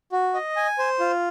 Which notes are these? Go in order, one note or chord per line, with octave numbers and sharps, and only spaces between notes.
F#4
D#5
G#5
C5
F4